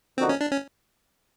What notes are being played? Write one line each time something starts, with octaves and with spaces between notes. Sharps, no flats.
D3 F3 A#3 C4 D#4 F#4
C#4
D4
C#4